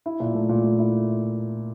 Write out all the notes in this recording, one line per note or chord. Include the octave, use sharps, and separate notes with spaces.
E4
A#2
A3
A#2
A3
E4